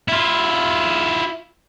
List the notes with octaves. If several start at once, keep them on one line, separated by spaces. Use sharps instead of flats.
E4 F4